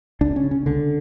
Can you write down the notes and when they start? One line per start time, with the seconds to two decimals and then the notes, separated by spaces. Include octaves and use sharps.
0.21 C#2 D4
0.36 C#4
0.43 C#3
0.51 C#4
0.66 C#2 D3